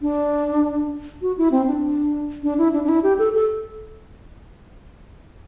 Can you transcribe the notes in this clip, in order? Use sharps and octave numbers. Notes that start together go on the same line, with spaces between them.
D4
F#4
E4
C4
D4
D4
E4
D4
D4
E4
G4
A4
A4